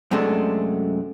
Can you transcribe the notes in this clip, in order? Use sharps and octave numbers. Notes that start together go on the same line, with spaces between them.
F#2 C3 G#3 A3 D4